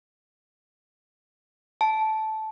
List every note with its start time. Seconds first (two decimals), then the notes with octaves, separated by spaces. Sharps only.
1.81 A5